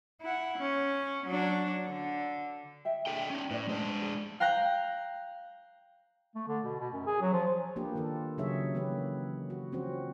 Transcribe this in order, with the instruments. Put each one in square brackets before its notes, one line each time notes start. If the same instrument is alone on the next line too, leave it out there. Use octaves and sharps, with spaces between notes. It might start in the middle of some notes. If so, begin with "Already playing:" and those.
[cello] E4 F#5
C#4
F#3 D4
D3
[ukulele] D#5 E5 G5
[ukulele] D4 G#4 A4 [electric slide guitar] D5 D#5 G5
[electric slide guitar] C#4 D#4
[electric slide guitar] A2 [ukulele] B4 D5
[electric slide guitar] G#3 D4 [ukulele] C5
[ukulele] G#4
[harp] F5 G5 A#5 F#6
[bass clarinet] A3
D3
B2
B2
F#2
G#4
F#3
F3
[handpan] A#3 D4 F4 G4 B4
D#3 F4 A4
C#3 F#3 D#4 G#4 C#5 E5
E3 A#3 B3 C#4 G4 B4
F#4
F3 C4 C#4 F#4 C5